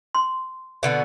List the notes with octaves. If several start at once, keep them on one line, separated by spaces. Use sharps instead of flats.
C6
B2 D3 B3